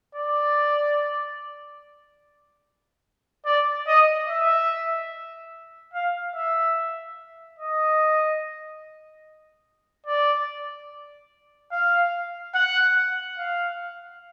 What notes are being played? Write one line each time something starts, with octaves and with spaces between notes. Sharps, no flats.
D5
D5
D#5
E5
F5
E5
D#5
D5
F5
F#5
F5